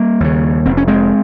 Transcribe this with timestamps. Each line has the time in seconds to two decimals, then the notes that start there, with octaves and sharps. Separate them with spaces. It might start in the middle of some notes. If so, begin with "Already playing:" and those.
Already playing: G3 A#3
0.20 D#2 C#3
0.66 F1 C4
0.77 C#4
0.88 G#3 C4